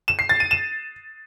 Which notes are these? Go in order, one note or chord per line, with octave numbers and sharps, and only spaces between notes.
E7
C7
A6
D#7
E7